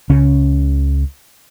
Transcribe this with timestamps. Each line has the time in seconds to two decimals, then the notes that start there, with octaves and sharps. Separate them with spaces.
0.09 C#2 C#3 C#4